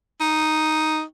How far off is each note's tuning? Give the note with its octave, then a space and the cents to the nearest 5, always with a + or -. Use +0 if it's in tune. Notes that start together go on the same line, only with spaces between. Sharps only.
D#4 +0